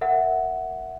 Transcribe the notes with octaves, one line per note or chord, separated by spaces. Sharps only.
A#4 E5 F#5